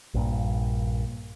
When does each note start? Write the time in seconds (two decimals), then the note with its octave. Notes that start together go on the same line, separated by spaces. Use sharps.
0.14 A#1 G2 A#2